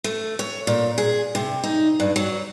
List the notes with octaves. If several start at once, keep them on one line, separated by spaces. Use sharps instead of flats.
A3
C#5
A#2
G#4
C3
D#4
G2
F#3